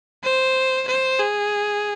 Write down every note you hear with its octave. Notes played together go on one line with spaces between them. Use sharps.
C5
C5
G#4